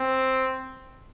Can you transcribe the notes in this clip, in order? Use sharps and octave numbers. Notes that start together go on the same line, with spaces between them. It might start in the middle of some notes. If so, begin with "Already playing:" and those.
Already playing: C4